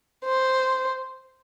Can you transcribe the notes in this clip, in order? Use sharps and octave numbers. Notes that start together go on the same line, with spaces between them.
C5